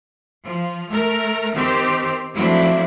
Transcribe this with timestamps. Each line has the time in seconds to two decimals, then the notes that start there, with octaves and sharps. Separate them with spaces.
0.44 F3
0.91 A3 A#4
1.54 D#3 C4 G4
2.35 F3 F#3 A3 C4 D4 E4